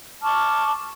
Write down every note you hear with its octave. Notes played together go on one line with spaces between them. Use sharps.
A5 C#6 D6 F6